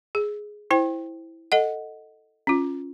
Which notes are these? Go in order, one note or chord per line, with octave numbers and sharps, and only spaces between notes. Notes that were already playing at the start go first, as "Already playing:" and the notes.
G#4
E4 C5 G5
A4 D#5 F#5
C#4 F4